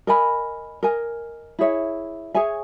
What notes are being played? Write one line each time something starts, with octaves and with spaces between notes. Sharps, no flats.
A#4 D#5 G#5 B5
A#4 D#5 G#5
E4 G#4 C#5 E5
G#4 C#5 E5 G#5